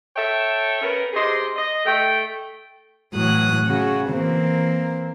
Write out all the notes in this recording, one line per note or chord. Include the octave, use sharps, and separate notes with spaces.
A4 C#5 E5 G5 A5
B3 C#4 A#4
C3 G#4 D#5 C6
D#5
A3 G5
A2 E3 F#3 D#6 F#6
C#3 F#4
E3 A#3 C4